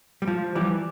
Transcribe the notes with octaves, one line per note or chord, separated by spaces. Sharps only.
G3
F3
E3 G3